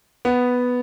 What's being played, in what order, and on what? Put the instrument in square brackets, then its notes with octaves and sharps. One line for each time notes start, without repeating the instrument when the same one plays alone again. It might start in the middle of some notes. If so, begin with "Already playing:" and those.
[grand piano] B3